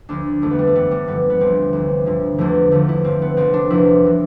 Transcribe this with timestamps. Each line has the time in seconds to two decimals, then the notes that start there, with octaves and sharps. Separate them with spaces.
0.09 D2 D3 F3 D4
0.42 F2 E3 A3
0.51 B3
0.59 G3
0.67 A3
0.75 G2 E3 B3
0.91 G3
1.07 G2 D3 F3 B3
1.30 B3
1.41 D2 D3 F3 C4
1.73 D2 C3 E3
2.06 G2 D3 F3
2.38 E2 D3 F3 A3
2.71 E2 D3 F3 A3
2.89 E4
3.04 G2 F3 C4
3.22 B3
3.37 C2 C3 F3 C4
3.54 D4
3.70 E2 C3 F3 E4
4.05 C3 E3